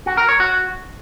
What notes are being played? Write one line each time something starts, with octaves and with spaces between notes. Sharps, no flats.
F#4
A#4
C#5
F#4